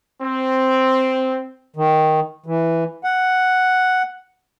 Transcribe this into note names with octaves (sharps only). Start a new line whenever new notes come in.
C4
D#3
E3
F#5